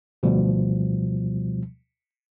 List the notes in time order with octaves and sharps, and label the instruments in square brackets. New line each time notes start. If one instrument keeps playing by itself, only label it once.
[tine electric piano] D2 B2 F3 G3